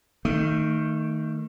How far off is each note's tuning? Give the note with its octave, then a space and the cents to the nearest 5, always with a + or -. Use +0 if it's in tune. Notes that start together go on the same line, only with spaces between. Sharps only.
D#3 +5 A3 +30